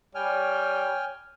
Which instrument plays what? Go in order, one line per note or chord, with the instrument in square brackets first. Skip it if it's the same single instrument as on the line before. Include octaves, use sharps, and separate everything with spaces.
[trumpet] G3 [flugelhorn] C#5 [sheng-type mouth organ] G5 G#5 F6